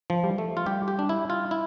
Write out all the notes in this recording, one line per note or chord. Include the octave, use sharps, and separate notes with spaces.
F3
G3
A3
F4
G3 G4
G4
D4
E4
F4
E4